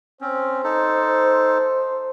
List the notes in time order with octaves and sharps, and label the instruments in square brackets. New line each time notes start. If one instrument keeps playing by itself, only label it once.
[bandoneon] C4 C#4 [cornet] C5
[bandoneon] D#4 A4